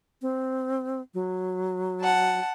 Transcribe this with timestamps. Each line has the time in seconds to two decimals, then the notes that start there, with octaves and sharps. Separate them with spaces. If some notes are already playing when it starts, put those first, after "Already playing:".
0.22 C4
1.14 F#3
1.99 F#5 A5